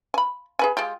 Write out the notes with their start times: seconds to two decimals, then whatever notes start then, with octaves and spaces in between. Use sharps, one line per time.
0.14 G#5 B5
0.59 G#4 B4 G#5
0.77 G#3 F4 G4